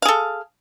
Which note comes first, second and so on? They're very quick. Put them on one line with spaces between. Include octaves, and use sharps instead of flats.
F5 G#4 A4